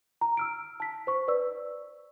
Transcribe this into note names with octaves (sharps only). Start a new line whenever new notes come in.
A#5
E6 F6 D7
A5 B6
C5 C#6
B4 D5 E6